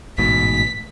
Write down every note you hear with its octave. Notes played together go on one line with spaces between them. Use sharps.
A1 G#2 B2 B6